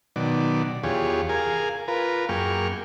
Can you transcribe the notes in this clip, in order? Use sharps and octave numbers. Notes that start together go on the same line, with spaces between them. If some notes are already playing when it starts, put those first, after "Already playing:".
B2 D#3 F#3 D5
E2 F4 G4 G#4 C#5
G#4 A#4 F5 G#5
F4 A#4 B4
F#2 A#3 G#4 G5 C#6 F6